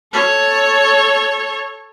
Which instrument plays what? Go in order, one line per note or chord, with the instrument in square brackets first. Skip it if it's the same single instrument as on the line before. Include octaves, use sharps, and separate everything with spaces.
[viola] A4 C#5